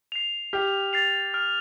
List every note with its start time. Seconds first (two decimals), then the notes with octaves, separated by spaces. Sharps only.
0.12 C7 F7
0.53 G4 F6
0.93 A6 C7 F7
1.34 F6